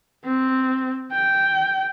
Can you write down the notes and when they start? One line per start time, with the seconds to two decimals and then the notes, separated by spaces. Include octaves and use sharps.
0.25 C4
1.12 G5